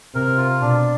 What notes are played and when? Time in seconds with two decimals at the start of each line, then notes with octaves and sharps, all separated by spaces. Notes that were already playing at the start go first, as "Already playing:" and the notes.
0.15 C3 A#4
0.37 F4
0.61 B2 D4